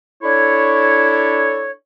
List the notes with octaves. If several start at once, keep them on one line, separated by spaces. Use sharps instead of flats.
D4 E4 A4 C#5